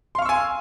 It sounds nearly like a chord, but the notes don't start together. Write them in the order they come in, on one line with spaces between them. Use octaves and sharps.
C6 F5 C#6 E6 G#5